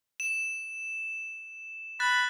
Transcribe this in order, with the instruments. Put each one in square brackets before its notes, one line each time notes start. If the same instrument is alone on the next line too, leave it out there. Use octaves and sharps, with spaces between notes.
[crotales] E7
[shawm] B5 [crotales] F#6 A6